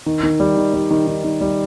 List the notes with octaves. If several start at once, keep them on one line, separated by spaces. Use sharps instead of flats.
D#3
D#3
G3
D#3
G3
D#3
D#3
D#3
G3